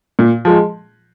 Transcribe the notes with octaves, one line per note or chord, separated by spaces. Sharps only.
A#2
F3 G#3